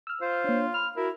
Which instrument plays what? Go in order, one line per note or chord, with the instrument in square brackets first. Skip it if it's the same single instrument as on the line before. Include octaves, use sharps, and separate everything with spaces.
[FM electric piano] E6 F6
[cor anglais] F4 [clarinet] C5
[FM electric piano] A#3 D4 [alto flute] C#5
[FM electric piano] F5 [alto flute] B5 [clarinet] F6
[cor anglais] E4 [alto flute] F#4 [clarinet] A#4